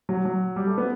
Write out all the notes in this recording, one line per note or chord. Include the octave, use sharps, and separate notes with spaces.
F#3
F#3
G3
A3
B3